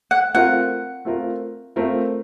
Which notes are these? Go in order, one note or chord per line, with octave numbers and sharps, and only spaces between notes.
F#5
A3 C4 F4 A#4 F#5
A3 C4 F4 A#4
A3 C4 F4 A#4